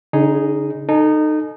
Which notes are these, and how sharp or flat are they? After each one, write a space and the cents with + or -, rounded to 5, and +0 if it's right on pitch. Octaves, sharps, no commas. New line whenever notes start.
D3 -40 D#4 +0 G#4 +0
D#4 -20 A4 +10 G#5 +40